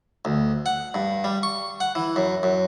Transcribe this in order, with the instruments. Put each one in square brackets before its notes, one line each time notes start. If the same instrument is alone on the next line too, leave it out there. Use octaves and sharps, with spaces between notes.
[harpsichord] D2
F#5
G2
G3
C#6
F#5
E3
F#2
F#2